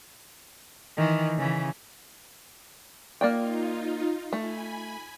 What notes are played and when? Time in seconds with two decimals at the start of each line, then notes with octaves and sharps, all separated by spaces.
0.97 D#3 E3
1.38 C#3 E3
3.21 A#3 D#4 F4 D5 G5
4.33 A3 G#5 B5